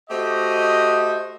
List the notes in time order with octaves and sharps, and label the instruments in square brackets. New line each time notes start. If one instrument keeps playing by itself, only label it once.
[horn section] A3 F#4 G4 C5 D#5